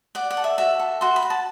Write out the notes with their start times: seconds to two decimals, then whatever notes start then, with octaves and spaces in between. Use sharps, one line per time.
0.15 D5 F#5
0.30 F#5
0.37 A4
0.44 E5
0.58 F#4 E5
0.79 A4
1.01 F#4 C6
1.16 B5
1.23 F#4
1.30 A5